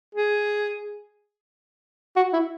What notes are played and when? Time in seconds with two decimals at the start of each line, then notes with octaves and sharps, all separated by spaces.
0.15 G#4
2.16 F#4
2.33 E4